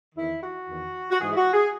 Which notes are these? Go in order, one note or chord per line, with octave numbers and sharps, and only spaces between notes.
E2 D#3 E4
F#4
E2 D#3
F#4
G#2 E3 G#4
E4
F#4
G#4